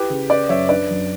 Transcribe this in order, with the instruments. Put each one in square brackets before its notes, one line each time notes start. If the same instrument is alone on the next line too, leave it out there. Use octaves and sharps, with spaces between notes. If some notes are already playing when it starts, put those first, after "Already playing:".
Already playing: [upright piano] E4 [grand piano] G4 B4
[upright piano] C#3
[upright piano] C#4 [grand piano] B4 D5
[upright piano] F#2 [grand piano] C#5 E5
[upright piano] D4 [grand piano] B4 D5
[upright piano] F#2